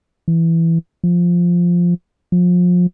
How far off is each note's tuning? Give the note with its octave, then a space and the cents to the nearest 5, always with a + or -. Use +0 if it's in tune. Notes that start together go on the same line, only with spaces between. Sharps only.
E3 +5
F3 +0
F3 +30